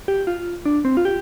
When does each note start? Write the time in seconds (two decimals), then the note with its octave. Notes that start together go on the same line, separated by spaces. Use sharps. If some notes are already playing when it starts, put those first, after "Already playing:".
0.08 G4
0.27 F4
0.65 D4
0.85 C4
0.97 F4
1.05 G4